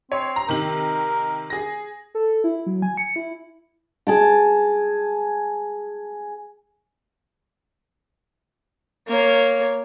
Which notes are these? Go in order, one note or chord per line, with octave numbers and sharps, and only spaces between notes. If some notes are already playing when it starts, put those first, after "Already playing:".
C4 C#5
A#5
C3 D#3 A#4 F#7
G#4 A#6
A4
E4
F#3
G#5
C#7
E4
G#4 A5 D6
A#3 C#5